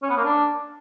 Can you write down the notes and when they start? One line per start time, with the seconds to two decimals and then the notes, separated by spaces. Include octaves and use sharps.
0.03 C#4
0.10 B3
0.17 A#3
0.24 D4